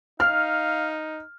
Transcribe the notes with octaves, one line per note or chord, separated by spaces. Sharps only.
D#4 F5 F6